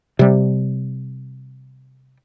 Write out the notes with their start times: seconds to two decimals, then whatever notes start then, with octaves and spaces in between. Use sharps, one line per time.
0.19 C3 G3